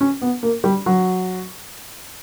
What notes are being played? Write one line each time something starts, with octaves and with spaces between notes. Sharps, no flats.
C#4
B3
A#3
G3
F#3